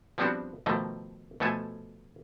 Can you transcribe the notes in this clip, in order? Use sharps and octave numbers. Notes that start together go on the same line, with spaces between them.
F3 G3 B3 C4 D4 F#4
B2 D#3 F3 A3 A#3
B2 F3 A3 A4 G#5